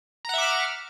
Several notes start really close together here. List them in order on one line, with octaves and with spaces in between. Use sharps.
A#5 F#5 E5 D6 F6